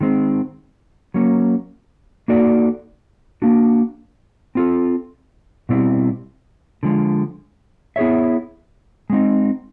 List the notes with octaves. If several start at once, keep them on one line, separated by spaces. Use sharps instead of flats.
D#3 G#3 C4
F#3 A#3 C#4
A#3 D#4 F#4 A4 D5
A#3 D4 F#4
C4 F4 A4
B2 G3 C4 E4
D3 F3 G#3
B3 E4 G#4 C#5 E5
G#3 C4 D#4